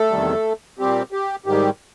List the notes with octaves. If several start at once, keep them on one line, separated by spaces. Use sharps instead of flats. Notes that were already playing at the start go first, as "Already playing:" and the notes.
Already playing: A3 A4
E2 C3 D#3 G3
A#2 G3 C4 G4
G4
G#2 D#3 G3 G4